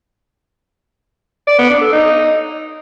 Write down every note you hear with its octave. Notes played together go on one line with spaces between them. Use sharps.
D5
B3
D4
A4
D#4